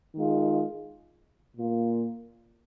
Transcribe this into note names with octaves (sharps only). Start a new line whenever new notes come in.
D#3 G#3 F4
A#2 A#3 F4